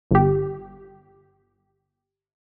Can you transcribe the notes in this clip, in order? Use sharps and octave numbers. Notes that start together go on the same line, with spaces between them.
G1 G4